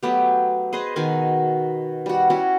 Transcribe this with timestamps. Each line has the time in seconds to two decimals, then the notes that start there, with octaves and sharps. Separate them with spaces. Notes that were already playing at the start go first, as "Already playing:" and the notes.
0.03 F#3 A3 B3 G4
0.73 G#4 B4 C5 D#5
0.96 B2 D#3 B4 G#5
2.06 G3 F#4
2.30 C#4 E4 F#4